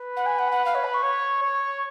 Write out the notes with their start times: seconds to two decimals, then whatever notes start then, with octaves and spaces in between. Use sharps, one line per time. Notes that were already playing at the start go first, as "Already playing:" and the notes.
Already playing: B4
0.16 F#5
0.26 G#5
0.39 F#5
0.52 F#5
0.65 F5
0.75 C#5
0.84 B5
0.94 C#6
1.03 C#5
1.42 C#5